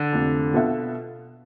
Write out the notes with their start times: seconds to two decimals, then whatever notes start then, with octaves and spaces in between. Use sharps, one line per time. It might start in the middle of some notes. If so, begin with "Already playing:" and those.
Already playing: D3
0.13 F2 C3 F3 A3 D4
0.53 B2 B3 F4 A4 E5